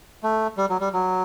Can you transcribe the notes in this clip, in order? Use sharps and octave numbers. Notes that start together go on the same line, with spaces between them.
A3
G3
F#3
G3
F#3